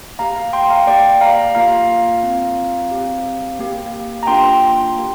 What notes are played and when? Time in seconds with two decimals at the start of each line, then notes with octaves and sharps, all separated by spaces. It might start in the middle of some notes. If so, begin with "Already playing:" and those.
0.19 A#3 G4 F5 A#5
0.36 F5 A#5
0.53 G5 C6
0.70 F5 A#5
0.87 A#3 G4 D5 G5
1.21 F5 A#5
1.55 A#3 F4 F5 A#5
2.23 C4 F4
2.91 C4 G4
3.59 A#3 G4
4.23 A#5
4.27 A#3 D4 F4 G5 C6
4.96 A#3 G4